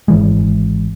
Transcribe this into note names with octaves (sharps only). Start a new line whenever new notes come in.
G#1 E3 G#3